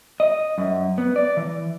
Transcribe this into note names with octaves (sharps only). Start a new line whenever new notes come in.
D#5
F#2
B3
D5
E3